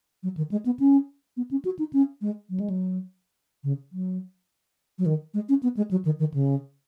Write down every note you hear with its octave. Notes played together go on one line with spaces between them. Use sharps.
F#3
D#3
G#3
B3
C#4
B3
C#4
F#4
D#4
C#4
G#3
F#3
G#3
F#3
C#3
F#3
F#3
D#3
G#3
C#4
B3
G#3
F#3
D#3
D#3
C#3